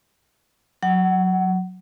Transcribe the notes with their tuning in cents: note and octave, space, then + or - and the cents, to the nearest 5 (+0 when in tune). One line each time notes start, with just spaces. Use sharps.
F#3 -5 F#5 +25